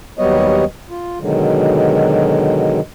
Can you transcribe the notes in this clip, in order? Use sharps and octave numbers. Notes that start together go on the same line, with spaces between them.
D#2 F#3 G3 B3 C#5 D#5
F4
B2 D3 D#3 F#3 G#3